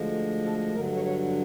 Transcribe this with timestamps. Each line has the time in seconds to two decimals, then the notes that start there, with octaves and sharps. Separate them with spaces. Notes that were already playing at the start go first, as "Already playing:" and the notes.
Already playing: D2 D3 F3 G#3
0.45 A4
0.75 G2 D3 F#3 A#4
0.96 C#5
1.06 C#5